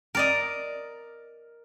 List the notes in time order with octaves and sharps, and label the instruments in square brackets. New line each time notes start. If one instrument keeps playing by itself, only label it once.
[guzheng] A#4 D5 D#5